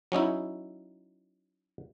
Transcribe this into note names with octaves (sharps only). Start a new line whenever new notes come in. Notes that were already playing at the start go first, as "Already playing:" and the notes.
F#3 C#4 D#4 E4